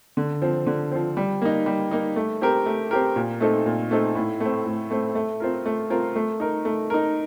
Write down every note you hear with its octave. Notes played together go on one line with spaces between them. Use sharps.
D3
F3 C4
D3
F3 C4
G3
A#3 D#4
G3
A#3 D#4
A3
C4 G4 A#4
A3
C4 G4 A#4
A#2
A3 C4 D#4 A4
A#2
A3 C4 D#4 A4
A2
A3 C4
A2
A3 C4
A3
C4 F4 A#4
A3
C4 F4 A#4
A3
D#4 A#4
A3
D#4 A#4